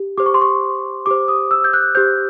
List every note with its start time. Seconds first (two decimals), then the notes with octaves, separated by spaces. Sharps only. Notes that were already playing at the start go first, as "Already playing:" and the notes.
Already playing: G4
0.18 G4 C5 D6
0.26 C#6
0.34 C6
0.41 C#6
1.06 G4 C5 D6
1.28 D#6
1.51 E6
1.64 G6
1.73 F#6
1.95 G4 C5 G6